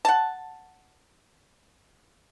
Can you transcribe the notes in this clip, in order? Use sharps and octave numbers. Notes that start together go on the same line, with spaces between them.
F#5 A5